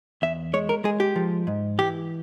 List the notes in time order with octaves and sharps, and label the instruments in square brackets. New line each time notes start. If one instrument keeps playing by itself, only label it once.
[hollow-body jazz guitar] E2 E5
G#3 C#5
A#4
G#3 G#4
G4
F3
G#2
E3 G4